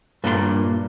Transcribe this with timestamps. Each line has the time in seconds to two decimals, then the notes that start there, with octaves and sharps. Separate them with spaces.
0.24 G2 A#2 B4 C6